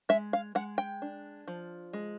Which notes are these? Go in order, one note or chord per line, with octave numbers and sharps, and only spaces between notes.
G#3 E5
F5
G#3 F#5
G5
D4
F3
G#3